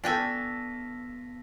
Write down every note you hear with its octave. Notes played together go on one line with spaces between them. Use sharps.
B3 D4 F4 A4 G5 G#5 A#6 B6